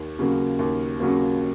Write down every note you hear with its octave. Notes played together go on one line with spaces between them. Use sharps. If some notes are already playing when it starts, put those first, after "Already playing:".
Already playing: D#2
C#3 F#3 A#3
D#2
C#3 F#3 A#3